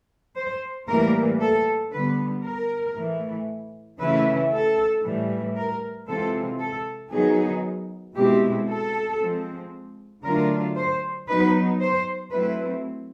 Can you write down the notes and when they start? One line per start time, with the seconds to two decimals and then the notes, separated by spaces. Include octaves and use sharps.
0.36 C5
0.88 A2 E3 G3 A#3 A#4
1.40 A4
1.92 D3 G3 B3 B4
2.44 A#4
2.96 A2 E3 A3
3.99 C#3 E3 A3 C#4 E4 B4
4.52 A4
5.03 A2 E3 G3
5.56 A#4
6.07 C3 E3 G#3 C4 F4 A4
6.60 A4
7.12 D#3 F#3 B3 D#4 G#4
8.15 B2 G#3 C4 E4 G4
8.67 A4
9.20 F3 G#3 C4
10.23 D3 F#3 A3 D4 F4 A#4
10.76 C5
11.27 F#3 B3 D#4 B4
11.80 C5
12.31 F#3 A3 C4 E4 B4